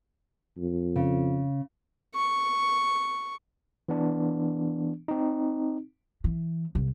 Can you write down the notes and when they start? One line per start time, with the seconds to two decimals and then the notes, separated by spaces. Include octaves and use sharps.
0.58 F2
0.96 C#3
2.15 C#6
3.89 E3 B3 D4
5.08 C4 D#4
6.24 E3
6.75 C2